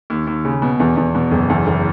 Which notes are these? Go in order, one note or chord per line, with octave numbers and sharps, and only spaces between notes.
D#2
D#2
C#3
B2
E2
E2
B2
F#1
E2
F#1